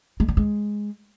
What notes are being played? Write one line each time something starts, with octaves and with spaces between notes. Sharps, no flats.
G#3
G3
G#3